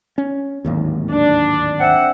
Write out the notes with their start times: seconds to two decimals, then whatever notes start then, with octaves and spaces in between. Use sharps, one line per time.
0.18 C#4
0.65 D1 G#1 D#2
1.11 D4
1.80 C4 E5 F#5